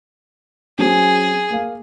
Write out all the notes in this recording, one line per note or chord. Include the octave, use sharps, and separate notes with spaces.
F#3 C4 C#4 G#4
A#3 F5